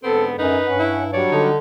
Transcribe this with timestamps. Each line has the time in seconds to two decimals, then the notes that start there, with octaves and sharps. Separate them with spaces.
0.04 G#2 D3 B3 C4 A4
0.39 F#2 D#4 B4
0.67 G2 C#4 F#5
0.79 E4
1.13 F#3 G3 D4 C#5 D5
1.32 D3 D#4